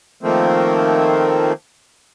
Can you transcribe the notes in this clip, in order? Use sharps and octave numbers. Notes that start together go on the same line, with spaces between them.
D#3 F3 A3 A#3 C4